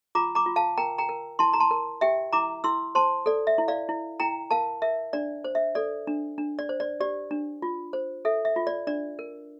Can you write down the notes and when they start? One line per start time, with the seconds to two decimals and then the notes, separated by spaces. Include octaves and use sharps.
0.15 F4 A#5 D6
0.35 A#5 D6
0.46 F4
0.56 F5 A5
0.78 A#4 G5 A#5
0.98 G5 A#5
1.09 A#4
1.39 E4 A5 C6
1.53 A#5
1.60 A5 C6
1.71 A#4
2.01 G4 E5 G5
2.33 E4 A#5 D6
2.64 E4 C6 E6
2.95 C5 A5 C6
3.26 A4 D5
3.47 E5
3.58 E4
3.68 D5 F5
3.89 E4
4.20 E4 G5 A#5
4.51 A#4 F5 A5
4.82 A#4 E5
5.13 D4 D5
5.44 C5
5.55 E5
5.75 A4 D5
6.07 D4
6.38 D4
6.59 D5
6.69 C5
6.80 D5
7.00 G4 D5
7.31 D4
7.62 F4
7.93 C5
8.25 A4 E5
8.45 E5
8.56 F4
8.67 D5
8.87 D4 D5
9.19 A#4